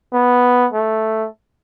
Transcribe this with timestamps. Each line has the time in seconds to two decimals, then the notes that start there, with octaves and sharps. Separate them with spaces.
0.13 B3
0.73 A3